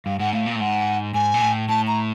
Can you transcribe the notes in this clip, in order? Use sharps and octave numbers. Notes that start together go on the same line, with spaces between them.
G2 F5
G#2 F#5
A2 F5
A#2
A2
G#2 F#5
G#2 G#5
A#2
A2
A2 A5
A#5